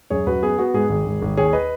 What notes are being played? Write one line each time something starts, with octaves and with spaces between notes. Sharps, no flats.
F#2 G#4 C#5
F#2 F#4 B4
B3 G#4
B3 F#4
G#2 G#4
G#1
G#1
G#1
D#2 G#4 C#5
B4 D#5